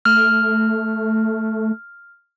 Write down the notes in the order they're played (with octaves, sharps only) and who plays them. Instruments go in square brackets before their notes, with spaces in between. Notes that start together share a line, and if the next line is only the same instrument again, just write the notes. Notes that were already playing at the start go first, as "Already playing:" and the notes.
[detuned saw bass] A3 [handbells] F6